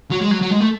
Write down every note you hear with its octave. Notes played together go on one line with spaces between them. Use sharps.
F#3
G#3
F#3
F#3
G#3
A3